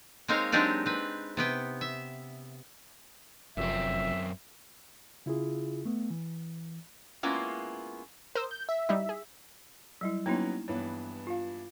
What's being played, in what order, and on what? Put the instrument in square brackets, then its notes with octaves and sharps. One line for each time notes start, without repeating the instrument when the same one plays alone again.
[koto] G#3 A#3 C4 D#4 C#5 F5
F#3 G#3 C4 D4 D#4 G4
C4 B4
C3 B3 G5
E5
[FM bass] F1 [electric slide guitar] F#2 C4 [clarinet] E5
[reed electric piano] C#3 E4 F4 G#4
A3 B3
E3
[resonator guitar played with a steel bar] G#3 A#3 B3 C#4 E4 F4
[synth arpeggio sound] A#4 D#6 E6 [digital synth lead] C5
[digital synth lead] G6
E5
[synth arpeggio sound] G3 D#4 E4
G#4
[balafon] F#3 G3 E4
[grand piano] F#3 B3 C#4 [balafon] A#3 D#4 E4
[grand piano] G2 E3 B3 [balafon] C#5
[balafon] F4 F5